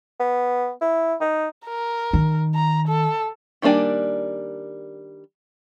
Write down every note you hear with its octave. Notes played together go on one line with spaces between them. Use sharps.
B3
E4
D#4
A#4
D#3
A#5
A4
D#3 G3 A#3 D4 G#5